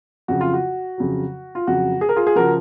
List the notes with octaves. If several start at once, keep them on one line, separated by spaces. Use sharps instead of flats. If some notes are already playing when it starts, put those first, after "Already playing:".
F2 C#3 F#3 F#4
F4
F#4
F2 C#3 F#3
F4
F2 C#3 F#3 F#4
G#4
A#4
F4 G#4
G#4
C#3 F3 F#4 A#4